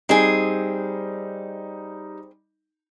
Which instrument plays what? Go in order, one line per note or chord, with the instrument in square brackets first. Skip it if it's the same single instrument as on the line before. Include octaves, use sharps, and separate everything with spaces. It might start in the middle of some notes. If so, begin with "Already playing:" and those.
[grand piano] G3 D#4 [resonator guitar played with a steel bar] C4 G#4